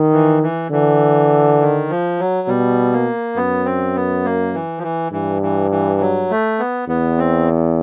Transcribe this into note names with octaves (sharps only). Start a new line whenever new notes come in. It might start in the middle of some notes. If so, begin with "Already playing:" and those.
Already playing: D#3
E3
E3
D3 E3
D#3
F3
F#3
B2 G3
A#3
F#2 B3
C4
B3
A#3
E3
F3
E3
G2 E3
E3
E3
F#3
A3
B3
E2 B3
C4